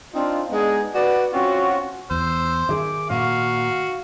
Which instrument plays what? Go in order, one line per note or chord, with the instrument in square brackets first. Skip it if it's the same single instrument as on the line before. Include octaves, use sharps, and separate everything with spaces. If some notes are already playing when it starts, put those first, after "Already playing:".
[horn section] C4 D4 D#4 F4
G#3 B3 D4 D#4 G#4
F#4 B4 D5
C4 C#4 F4 F#4
[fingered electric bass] E2 [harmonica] C5 [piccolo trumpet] E6
[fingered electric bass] D#3 [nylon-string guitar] G#4 E5 [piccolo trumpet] D6
[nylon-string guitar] A#2 [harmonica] F#4 [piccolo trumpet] F5